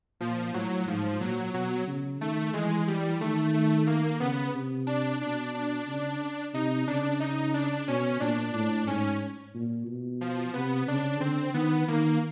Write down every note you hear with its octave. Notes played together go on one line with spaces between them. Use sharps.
A#2 F3
A2 F#3
G#2 F3
A#2 F#3
B2 F#3
C#3
D#3 A3
E3 G#3
G3
D#3 A3
A3
A#3
C#3 B3
C3
D4
B2 D4
D4
C#3
C3 D#4
C#3 D4
D#4
D4
B2 C#4
A#2 D4
A2 D4
G#2 C#4
A#2
B2
F3
C3 B3
C#3 D4
D3 C4
D#3 B3
D#3 A#3